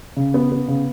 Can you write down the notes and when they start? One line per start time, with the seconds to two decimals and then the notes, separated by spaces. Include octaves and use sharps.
0.17 C#3
0.34 B3
0.52 B3
0.68 C#3